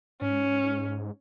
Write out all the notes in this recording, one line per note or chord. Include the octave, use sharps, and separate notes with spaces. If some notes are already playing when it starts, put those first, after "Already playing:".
G#2 C#4